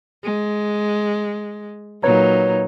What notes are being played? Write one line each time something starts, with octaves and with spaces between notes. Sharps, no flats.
G#3
A#2 F#3 D#4 B4 C#5 A#5